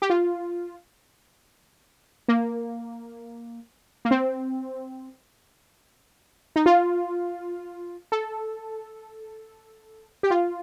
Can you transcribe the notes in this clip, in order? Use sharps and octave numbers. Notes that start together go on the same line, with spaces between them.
G4
F4
A#3
A#3
C4
D#4
F4
A4
G4
F4